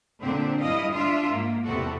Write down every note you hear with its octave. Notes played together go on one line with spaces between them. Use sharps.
A#2 D3 C4 D4
G2 E4 D#5 F5
D4 F4 E5
G#2 A#3
E2 C3 B3 F#4 A4